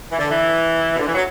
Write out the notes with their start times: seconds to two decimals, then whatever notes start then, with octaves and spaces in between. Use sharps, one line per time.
0.10 E3
0.19 D3
0.28 E3
0.92 B2
0.99 D3
1.06 E3
1.14 F#3